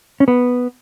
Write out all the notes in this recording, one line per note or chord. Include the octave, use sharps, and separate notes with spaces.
C#4
B3